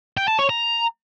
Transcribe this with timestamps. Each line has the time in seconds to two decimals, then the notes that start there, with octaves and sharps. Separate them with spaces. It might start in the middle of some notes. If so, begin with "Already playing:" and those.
0.17 G5
0.28 A5
0.39 C#5
0.50 A#5